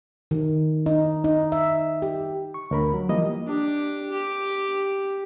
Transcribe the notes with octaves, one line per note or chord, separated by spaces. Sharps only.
D#3
D#4
D#4
E5
G4
C#6
D2 A#4 B5
F#3
E3 F3 G3 A#3 D#5
D4 G4
G4